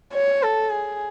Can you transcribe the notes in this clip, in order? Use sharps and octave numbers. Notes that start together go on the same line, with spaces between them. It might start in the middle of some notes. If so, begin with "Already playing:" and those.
C#5
A4
G#4